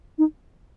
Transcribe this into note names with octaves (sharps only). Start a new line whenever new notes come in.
D#4